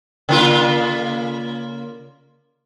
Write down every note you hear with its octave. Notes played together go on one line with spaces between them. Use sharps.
C#3 A#3 F4